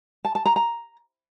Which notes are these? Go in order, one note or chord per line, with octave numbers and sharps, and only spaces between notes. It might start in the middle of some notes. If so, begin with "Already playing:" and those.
A5
A5
A#5
A#5